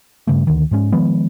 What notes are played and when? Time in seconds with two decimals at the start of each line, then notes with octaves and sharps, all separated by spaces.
0.27 G2 C#3 A3
0.47 D2 D#3
0.71 G#2 G#3 C#4
0.92 D#3 F3 G#3 B3